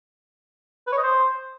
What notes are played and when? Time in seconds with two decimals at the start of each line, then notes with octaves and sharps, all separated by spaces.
0.87 B4
0.92 C#5
0.98 D#5
1.03 C5